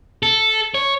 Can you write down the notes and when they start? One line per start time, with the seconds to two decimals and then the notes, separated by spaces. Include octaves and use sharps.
0.23 A4
0.74 C#5